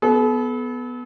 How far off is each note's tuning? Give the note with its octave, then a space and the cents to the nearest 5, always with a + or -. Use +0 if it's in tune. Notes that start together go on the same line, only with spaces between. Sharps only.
B3 +0 A4 -40